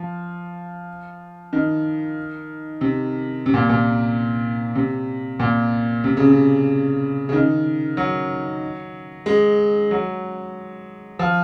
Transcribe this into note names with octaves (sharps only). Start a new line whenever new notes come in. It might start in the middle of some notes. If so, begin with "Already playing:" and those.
Already playing: F3
D#3
C3
C3
A#2
A#2
C3
A#2
C3
C#3
C3
C#3
D#3
F#3
G#3
F#3
F3